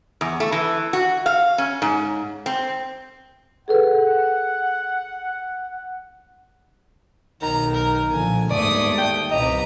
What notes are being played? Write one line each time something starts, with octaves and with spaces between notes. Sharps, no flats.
E2
A3
E3
F#4
F5
C#4
G#2
C4
G#4 A4 B4 F#5
B1 D#3 A#5
A#4
A#2 D3 F3 G#5
G1 D#2 G#2 A3 D5 D#6
G5
C2 C3 B4 D#5 A#5